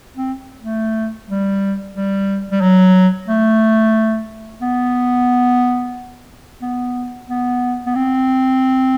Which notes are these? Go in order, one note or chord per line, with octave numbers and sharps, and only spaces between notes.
C4
A3
G3
G3
G3
F#3
A3
B3
B3
B3
B3
C4